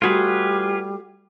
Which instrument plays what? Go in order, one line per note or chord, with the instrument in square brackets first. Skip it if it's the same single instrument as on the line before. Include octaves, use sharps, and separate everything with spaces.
[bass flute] G3 [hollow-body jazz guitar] A3 F#4 [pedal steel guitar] F4 G#4 B4